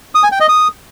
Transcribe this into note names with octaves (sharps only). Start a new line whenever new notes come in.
D#6
G#5
G5
D#5
D#6